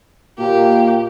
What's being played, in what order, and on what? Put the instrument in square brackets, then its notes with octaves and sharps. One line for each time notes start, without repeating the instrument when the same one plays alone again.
[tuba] A#2 [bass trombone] A#3 [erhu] G4